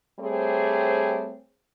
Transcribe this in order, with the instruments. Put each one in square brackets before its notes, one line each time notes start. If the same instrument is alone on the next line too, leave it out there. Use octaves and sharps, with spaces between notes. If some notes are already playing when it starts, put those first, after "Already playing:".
[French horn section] G3 A3 C4 G#4 C5 C#5